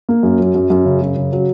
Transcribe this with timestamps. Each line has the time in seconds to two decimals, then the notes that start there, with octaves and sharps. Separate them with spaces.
0.09 A#3
0.23 F#2
0.40 F#3
0.55 F#2
0.70 F#2
0.85 C#3
1.02 F#2
1.16 C#3
1.33 F#3